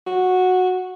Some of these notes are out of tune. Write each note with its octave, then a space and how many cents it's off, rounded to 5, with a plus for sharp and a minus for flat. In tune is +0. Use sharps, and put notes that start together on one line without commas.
F#4 -10